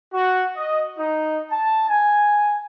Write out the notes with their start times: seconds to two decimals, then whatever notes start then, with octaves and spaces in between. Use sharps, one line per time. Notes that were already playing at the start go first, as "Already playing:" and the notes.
0.12 F#4
0.57 D#5
0.98 D#4
1.49 A5
1.88 G#5